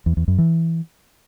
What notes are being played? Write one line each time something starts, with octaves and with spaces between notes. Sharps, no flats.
E2
E2
F#2
E3